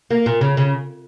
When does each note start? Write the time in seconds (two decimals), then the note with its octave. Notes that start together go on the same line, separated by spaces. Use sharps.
0.11 A#3
0.26 A#2
0.41 C#3
0.57 C#3